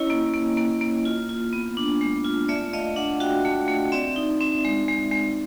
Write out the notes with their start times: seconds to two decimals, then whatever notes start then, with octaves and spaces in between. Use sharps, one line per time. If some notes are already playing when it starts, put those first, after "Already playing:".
Already playing: C#4 E4 C#5 D#5
0.10 A#3
0.34 A#3
0.57 A#3
0.81 A#3
1.05 F4
1.29 F4
1.53 B3
1.77 D4
2.01 G#3
2.24 F4
2.48 A3 D5 E5
2.73 A3 D#5 F5
2.96 D4 E5 F#5
3.20 F#4 F5 G5
3.45 A3
3.68 A3
3.92 C4 D5 E5
4.16 D#4
4.41 C4
4.65 G#3
4.88 G#3
5.11 G#3